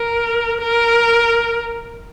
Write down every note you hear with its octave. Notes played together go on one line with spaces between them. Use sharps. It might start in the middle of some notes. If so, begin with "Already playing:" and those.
Already playing: A#4
A#4